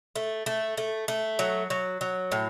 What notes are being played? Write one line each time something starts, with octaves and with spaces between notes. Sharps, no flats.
A3
A3
A3
A3
F#3
F#3
F#3
A2